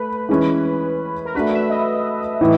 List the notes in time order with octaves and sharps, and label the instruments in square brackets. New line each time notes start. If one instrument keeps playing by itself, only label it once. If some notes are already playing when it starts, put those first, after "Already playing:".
Already playing: [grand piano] A3 [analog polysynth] B4
[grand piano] E3 G#3 C#4
[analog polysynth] A#4
[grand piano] A3 D4 F#4 [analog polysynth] B4
[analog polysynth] E5
D#5
[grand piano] A2 E3